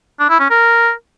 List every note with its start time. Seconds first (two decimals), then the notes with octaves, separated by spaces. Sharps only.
0.19 D4
0.30 E4
0.40 C#4
0.50 A#4